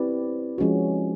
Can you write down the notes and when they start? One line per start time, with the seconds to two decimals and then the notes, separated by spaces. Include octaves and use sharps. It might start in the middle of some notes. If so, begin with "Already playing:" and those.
Already playing: C4 E4 G4 B4 D5
0.58 F3 G#3 C#4 F#4